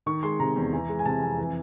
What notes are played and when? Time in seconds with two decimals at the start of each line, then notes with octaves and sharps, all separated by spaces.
0.06 D#3 C#6
0.23 G#3 C6
0.39 C3 A#5
0.56 E2
0.73 E3
0.89 G#3
0.99 G#5
1.05 C3 A5
1.21 F2 G#5
1.38 E3